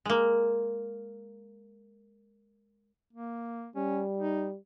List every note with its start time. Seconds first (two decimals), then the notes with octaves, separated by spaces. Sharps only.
0.05 G#3 A#3
3.13 A#3
3.76 G3 C#4
4.18 D#4